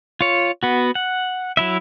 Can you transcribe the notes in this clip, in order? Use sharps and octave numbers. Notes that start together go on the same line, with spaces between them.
F4 C#5
B3 F#4
F#5
F#3 E4 E5